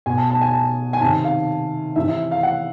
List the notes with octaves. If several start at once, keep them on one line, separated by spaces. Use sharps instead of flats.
B2 G#5
A5
A5
G#5
A5
G#5
C3 D#3 A5
F5
C3 E3 E5
E5
F5
F#5